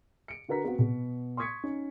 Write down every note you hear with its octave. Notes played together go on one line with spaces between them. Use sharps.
C#7 D7
D3 F#4 A#4 B4 A#5 B6
B3 C4 F#4
B2 B3
C6 C#6 D#6 G#6 B6 C#7
C#4 D#4